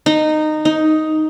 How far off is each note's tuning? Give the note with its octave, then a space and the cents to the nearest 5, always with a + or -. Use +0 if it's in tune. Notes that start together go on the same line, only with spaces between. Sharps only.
D#4 -15
D#4 +5